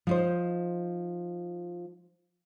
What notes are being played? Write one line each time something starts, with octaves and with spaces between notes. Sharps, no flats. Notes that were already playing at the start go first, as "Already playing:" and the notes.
F3 D#4 C5